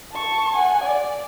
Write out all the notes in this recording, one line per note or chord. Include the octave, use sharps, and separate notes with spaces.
A5 C#6
F#5 G#5
D5